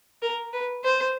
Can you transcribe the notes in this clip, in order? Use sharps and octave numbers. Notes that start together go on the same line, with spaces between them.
A#4
B4
C5